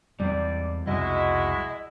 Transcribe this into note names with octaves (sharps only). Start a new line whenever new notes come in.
E2 G#2 G3 C4 D5
C2 F2 B2 G#3 E4 F#4 D#5